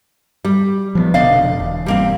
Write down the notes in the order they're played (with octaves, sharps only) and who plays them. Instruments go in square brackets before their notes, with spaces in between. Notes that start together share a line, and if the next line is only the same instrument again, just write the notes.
[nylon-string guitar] G3
[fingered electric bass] F3 F#3 B3
[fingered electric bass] F1 B2 D3 [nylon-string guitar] D5 D#5 F5
[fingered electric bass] E1
[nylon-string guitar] G3 A#3 C4